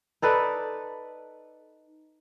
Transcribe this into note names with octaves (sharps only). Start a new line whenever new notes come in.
D#4 A4 B4 D5